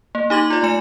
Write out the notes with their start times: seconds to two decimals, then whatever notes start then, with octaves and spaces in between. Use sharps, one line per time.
0.15 A#3
0.30 D#4 G4 D6 G#6 F#7
0.50 F4 D5
0.63 A3 G#5 C#7 E7